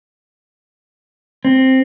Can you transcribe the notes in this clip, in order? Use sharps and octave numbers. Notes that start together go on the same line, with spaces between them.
C4